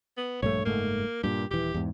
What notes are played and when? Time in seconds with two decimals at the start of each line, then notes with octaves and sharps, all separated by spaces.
0.17 B3
0.42 A#1 G2 A3 C#5
0.65 F#1 G#2 A3 A#3
1.24 G2 A#2 G4
1.51 D#1 E3 G4
1.74 E2 G#2